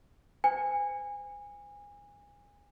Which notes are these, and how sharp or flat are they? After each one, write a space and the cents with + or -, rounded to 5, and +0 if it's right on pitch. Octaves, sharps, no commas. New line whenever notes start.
C5 -35 G#5 -25